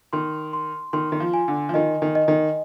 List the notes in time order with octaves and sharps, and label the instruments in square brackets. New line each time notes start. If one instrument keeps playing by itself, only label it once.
[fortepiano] D#3 [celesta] C6
[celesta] C6
[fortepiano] D#3 [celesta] C6
[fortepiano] D#3
F3
[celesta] G#5
[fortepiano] D3
F3
[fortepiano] D#3 [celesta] D#5
[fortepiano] D#3
[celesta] D#5
[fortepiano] D#3